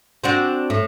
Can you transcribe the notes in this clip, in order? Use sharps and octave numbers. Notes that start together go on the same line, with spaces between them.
C4 D4 F#4
A2